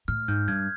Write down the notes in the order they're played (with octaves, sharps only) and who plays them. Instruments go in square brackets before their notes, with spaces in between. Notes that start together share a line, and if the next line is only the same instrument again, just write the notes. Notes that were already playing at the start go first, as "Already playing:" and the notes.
[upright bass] A2 [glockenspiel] F6
[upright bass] G#2 [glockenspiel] G6
[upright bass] G2 [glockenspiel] G#6